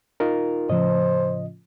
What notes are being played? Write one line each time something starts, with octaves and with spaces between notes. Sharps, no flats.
D#4 F4 A#4
A2 C#3 F3 C5 D#5